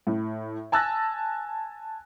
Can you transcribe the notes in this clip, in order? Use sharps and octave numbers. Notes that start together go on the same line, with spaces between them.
A2
G#5 A5 E6 F#6 A6 A#6